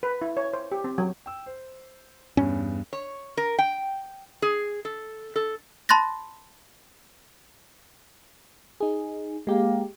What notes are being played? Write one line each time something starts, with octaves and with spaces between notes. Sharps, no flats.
B4
E4
C#5
C5
G4
C4
F#3
G5 E6
C5
E2 G2 C#4
C#5
A#4
G5
G#4
A4
A4
A5 B5 C6 F#6 A6 A#6
D#4 G#4
G#3 A#3 G4